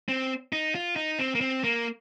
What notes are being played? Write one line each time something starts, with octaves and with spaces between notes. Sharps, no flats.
C4
D#4
F4
D#4
C4
A#3
C4
A#3